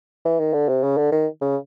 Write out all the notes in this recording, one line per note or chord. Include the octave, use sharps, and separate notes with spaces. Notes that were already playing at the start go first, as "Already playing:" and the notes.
E3
D#3
D3
C3
C#3
D3
D#3
C#3